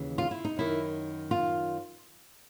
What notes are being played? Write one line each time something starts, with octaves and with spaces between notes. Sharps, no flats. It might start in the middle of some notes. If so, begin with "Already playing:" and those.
Already playing: D#2 C#3 E3
F4
E4
D#4
F#2 D#3 E4
F4